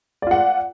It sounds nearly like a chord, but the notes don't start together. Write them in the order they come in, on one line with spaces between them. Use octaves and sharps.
D5 F4 F#5